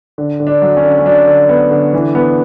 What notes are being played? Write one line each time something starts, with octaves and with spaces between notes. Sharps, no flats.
D3
D3
D4
F#3
C#4
D3
C#4
F#3 D4
D3
B3
D3
E3
B3